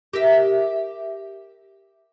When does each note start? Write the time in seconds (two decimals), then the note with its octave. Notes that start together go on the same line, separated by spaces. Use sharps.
0.13 G4 A#4 E5